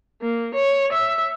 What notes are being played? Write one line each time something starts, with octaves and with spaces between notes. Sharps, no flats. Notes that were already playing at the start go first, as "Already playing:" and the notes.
A#3
C#5
E5